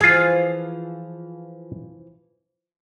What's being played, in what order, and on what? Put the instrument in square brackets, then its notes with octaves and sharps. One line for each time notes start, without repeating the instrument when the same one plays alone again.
[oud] E3 F3 [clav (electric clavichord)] F4 G#4